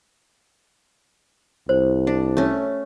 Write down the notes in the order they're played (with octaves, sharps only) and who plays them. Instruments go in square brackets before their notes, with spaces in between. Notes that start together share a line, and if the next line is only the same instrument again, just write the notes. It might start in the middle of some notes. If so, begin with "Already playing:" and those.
[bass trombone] C2 [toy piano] C5
[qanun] D4
A3 C#4